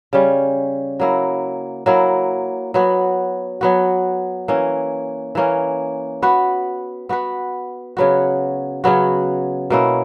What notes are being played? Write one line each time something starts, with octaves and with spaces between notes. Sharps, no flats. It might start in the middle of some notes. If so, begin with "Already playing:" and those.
C#3 G3 C#4
F#3 A#3 E4
F#3 A#3 E4
F#3 B3 F#4
F#3 B3 F#4
E3 A#3 C#4
E3 A#3 C#4
B3 F#4 B4
B3 F#4 B4
C#3 F#3 B3 F#4
C#3 F#3 B3 F#4
B2 A#3 C#4 E4